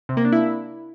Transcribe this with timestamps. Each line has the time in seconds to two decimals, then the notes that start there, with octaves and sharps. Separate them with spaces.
0.09 C3
0.17 A#3
0.25 D4
0.32 E4